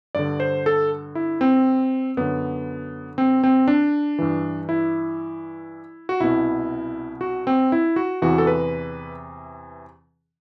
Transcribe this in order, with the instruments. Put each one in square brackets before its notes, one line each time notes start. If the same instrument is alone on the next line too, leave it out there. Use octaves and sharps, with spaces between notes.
[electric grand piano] G2 D3 D5
C5
A4
E4
C4
F#2 D3 B3
C4
C4
D4
G2 E3
E4
F#4
C2 B2 E4
F#4
C4
E4
F#4
E2 C3 E3 F#4
A4
B4